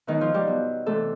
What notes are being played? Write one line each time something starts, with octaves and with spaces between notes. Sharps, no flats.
B2 D#3 F#3 D#4
F3 F4
G3 G4
B2 F#3
C3 E3 A3 A4